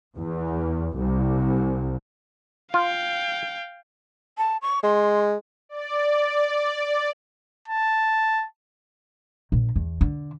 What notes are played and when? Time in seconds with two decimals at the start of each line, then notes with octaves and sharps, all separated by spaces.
0.16 E2
0.96 C2
2.74 F4 F5 G5
4.38 A5
4.62 C#6
4.83 G#3 C6
5.69 D5
7.68 A5
9.52 A#1
9.76 E2
10.01 D3